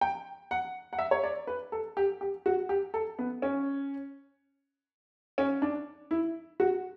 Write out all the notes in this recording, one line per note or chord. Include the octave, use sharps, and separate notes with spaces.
G5
F#5
F#5
E5
C#5
D5
B4
A4
G4
G4
F#4
G4
A4
B3
C#4
C#4
D4
E4
F#4